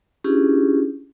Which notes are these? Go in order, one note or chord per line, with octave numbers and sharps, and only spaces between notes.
C#4 D4 E4 F4 G4 G#4